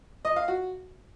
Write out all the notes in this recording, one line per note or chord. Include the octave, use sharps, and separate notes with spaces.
D#5
F5
F#4